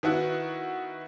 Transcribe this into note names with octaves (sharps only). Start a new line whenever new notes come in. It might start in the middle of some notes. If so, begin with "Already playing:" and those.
D#3 B3 E4 F#4